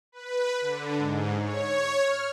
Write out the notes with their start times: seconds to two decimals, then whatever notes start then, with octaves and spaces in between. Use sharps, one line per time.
0.12 B4
0.61 D3
0.97 G#2
1.40 C#5
2.02 F6